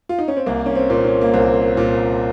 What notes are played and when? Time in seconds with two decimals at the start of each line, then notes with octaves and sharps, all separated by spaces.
0.09 F4
0.19 D#4
0.28 C#4
0.37 C4
0.46 C2 A#3
0.66 C#4
0.75 C4
0.90 A#2 C4
1.05 C#4
1.21 A#3
1.34 C2 C4
1.77 A#2